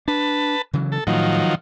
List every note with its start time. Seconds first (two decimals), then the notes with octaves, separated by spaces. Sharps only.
0.08 D4 B4 A5
0.73 C#3 E3 F#3
0.92 A4
1.07 A2 D#3 F3 F#3